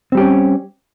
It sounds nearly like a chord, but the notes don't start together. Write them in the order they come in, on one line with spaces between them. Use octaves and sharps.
C4 G3 G4 C#4